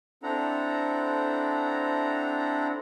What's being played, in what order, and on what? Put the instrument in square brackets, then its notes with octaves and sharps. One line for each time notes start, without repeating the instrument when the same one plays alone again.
[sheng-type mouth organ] C4 D4 E4 A4 F#5 A#5